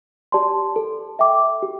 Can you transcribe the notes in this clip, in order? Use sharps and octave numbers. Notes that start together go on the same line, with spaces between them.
G4 D5 A5 C6
A4
E5 G5 D6
G4